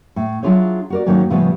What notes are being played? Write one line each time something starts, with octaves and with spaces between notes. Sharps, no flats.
A2
F#3 D4 E4 F4 G#4 C#5
F#4 A#4 D5
G#2 D#3 F#3 A#3 C#4
A2 C#3 F3 G3 B3